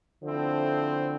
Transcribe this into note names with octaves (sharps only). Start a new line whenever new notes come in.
D3 F3 A3 C4 E4